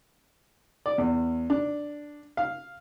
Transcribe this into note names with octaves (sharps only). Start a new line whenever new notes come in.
D5
E2
D4
F5